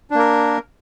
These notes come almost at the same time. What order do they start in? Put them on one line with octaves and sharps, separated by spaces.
D4 A#3 A#4